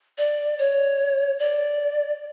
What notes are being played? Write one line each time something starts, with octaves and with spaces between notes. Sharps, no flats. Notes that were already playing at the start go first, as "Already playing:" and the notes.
D5
C#5
D5